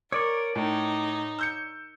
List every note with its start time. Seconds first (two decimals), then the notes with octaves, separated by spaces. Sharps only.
0.12 A#4 C#5 D5 C#6 D6
0.55 A2 D#4
1.39 E6 G6 C#7